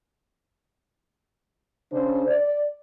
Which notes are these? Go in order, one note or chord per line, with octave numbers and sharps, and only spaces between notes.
C#3 D4 C5
D5